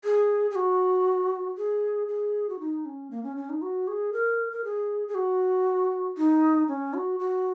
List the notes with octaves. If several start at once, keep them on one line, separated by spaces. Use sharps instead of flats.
G#4
G#4
F#4
G#4
G#4
F#4
D#4
C#4
A#3
C#4
C#4
D#4
F#4
G#4
A#4
A#4
G#4
G#4
F#4
D#4
C#4
F#4
F#4